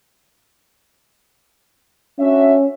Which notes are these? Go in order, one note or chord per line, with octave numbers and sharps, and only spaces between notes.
C#4 D4 F#4 E5